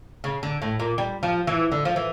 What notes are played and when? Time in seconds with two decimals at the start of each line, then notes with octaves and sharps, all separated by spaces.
0.24 C#3
0.43 D3
0.62 A2
0.80 A#2
0.98 G3
1.23 F3
1.47 E3
1.72 D3
1.85 F3
1.96 E3